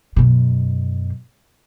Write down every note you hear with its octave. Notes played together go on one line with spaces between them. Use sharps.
F#2 B2